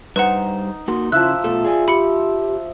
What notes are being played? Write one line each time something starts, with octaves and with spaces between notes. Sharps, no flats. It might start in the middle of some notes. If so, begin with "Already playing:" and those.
G2 D#4 B4 C5 F#5 A#5
A#3 D#4 F#4 C6
C#3 F3 E4 E5 F#6
B2 A3 A4
G#4 D5 G#5
G4 B5 C#7